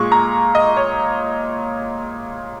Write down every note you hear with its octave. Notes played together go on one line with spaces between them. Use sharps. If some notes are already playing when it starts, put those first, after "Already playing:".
Already playing: A#2 G#3 C#6
A#5
D#5
C#5